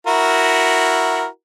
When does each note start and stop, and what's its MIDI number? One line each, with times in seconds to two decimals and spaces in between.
0.07 1.27 64
0.07 1.27 66
0.07 1.27 70